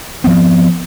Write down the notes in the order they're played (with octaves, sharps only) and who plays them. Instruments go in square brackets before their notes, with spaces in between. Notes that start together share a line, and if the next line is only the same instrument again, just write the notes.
[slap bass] F3 F#3 B3 C4